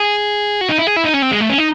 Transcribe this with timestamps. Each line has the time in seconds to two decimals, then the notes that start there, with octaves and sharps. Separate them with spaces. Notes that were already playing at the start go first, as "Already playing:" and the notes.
Already playing: G#4
0.61 F#4
0.69 D#4
0.79 E4
0.87 G#4
0.96 E4
1.05 D#4
1.14 C#4
1.22 C4
1.31 G#3
1.41 A3
1.50 C#4
1.58 D#4